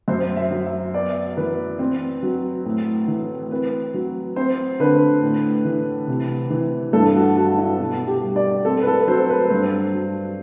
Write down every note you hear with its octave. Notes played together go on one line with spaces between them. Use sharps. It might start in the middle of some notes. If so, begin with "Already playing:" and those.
F#2 C5
E5
F#3
E5
B3 D5
E3 B4
C4
F#3
A2
E3
C4 B4
F#3
C4 C5
D3 B4
A2
E3
C3
E3
G2 A4
F#4
F#3 F#4
E4
B2 F#4
G4
G3
D5
C4 A4
B4
A4
F#3 C5
B4
G2 C5
F#3